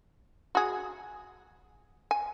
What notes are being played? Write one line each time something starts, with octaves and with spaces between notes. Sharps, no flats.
F#4 G#4
G#5